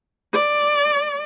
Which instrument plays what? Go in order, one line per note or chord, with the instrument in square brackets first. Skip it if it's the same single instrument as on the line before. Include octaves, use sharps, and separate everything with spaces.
[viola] D5